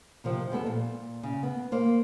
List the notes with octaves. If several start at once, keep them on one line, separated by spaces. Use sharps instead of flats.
C3 D#3 F3
G3 G#3 B3 A4
A#2
C#3
B3
A#3 C5